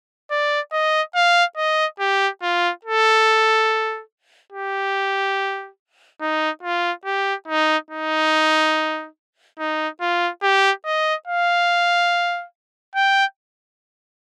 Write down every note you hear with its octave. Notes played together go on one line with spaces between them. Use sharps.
D5
D#5
F5
D#5
G4
F4
A4
G4
D#4
F4
G4
D#4
D#4
D#4
F4
G4
D#5
F5
G5